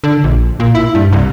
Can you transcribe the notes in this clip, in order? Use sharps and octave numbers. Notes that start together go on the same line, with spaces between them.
D3
A#1
A#2
E4
G2
C2